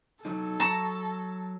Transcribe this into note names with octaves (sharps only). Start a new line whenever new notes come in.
F#3 D#4 A4
F#3 A5 A#5 C#6